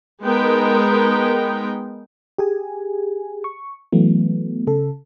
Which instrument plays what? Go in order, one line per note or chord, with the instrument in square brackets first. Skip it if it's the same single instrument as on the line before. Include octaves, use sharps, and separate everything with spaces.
[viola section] G#3 B3 D#4 A#4 G5
[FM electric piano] G4 G#4 G#5
C#6
E3 F#3 A3 B3
C#3 A4